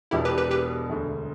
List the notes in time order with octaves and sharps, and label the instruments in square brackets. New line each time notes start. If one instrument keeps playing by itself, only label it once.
[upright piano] E1 E2 B2 B3 D4 [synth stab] E4 G4
[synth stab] G4 B4
G4 B4
G4 B4
[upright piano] E1 D2 D3